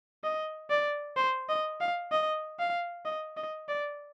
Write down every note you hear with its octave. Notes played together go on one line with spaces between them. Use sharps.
D#5
D5
C5
D#5
F5
D#5
F5
D#5
D#5
D5